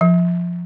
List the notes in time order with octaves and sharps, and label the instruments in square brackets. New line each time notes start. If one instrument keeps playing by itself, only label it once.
[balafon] F3